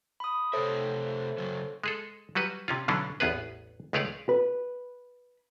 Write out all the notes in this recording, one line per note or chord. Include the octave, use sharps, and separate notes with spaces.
B5 D#6
C3 A3 A4 C5 C#5 E5
C#3 F#3
G#3 G#4 A4
F#3 G3 F#4 B4
C3 C#4 F4
B2 D3 E3 F#3 C#4 D4
A1 E2 B3 G#4 B4
C#2 G#3 A3 G#4 C#5 D5
B4